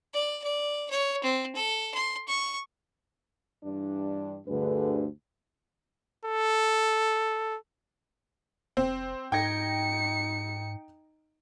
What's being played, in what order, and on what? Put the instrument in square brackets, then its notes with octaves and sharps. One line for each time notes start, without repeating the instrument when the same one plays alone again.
[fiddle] D5
D5
C#5
C4
A4
C6
C#6
[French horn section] G2 E3 D4
[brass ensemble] D2 G2 D3 [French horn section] G#4 B4
[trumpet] A4
[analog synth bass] F1 [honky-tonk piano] C4
[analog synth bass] G#2 [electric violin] D#4 C#7 [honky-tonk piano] G5 G#6 A#6